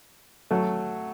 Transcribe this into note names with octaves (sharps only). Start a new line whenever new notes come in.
F#3 A3